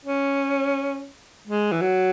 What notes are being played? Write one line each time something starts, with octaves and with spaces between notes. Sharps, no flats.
C#4
G#3
E3
F#3